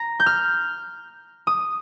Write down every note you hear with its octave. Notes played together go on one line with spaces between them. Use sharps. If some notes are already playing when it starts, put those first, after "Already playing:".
Already playing: A#5
G6
F6
D#6